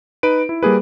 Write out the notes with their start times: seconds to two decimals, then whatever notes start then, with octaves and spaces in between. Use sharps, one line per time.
0.23 D#4 B4 D7
0.49 E4
0.63 G3 A#3 G#4 B4